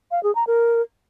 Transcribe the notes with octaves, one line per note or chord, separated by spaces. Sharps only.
F5
G#4
A#5
A#4